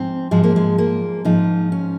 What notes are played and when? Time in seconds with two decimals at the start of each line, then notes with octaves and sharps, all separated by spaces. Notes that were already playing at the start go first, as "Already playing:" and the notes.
Already playing: G#2 F3 C4
0.31 G#2 F3 G#3
0.44 A#3
0.56 G#3
0.78 A#3
1.25 G#2 F3 D#4
1.72 C#4